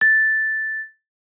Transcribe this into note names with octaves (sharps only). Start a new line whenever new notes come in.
A6